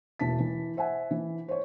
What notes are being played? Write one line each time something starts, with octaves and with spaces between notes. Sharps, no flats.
E1 E3 A5 B6
E3
C5 E5 F#5 G#5
E3
C5 C#5